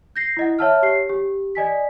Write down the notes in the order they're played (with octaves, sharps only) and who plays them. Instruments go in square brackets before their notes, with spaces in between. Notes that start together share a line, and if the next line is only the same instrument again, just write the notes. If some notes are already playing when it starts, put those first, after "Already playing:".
[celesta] G6 A#6 C7
E4 D#5 F#5
C#5 E5 F#5 A5 E6 F6
G4 C#5 C7
G4
D5 D#5 G#5 B6